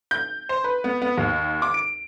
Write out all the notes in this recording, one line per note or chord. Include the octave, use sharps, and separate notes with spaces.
G6
C5
B4
B3
B3
D#2
D6
D7